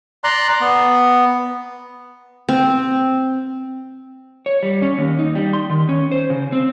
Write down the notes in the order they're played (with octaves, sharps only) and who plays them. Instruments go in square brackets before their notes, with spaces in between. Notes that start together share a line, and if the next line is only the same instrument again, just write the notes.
[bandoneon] D5 A#5 C6 F#6
B3
[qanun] C4
[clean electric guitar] C#5
G3
C#4
D#2
D#4
G3
C6
D#3
C#4
C5
C#3
C4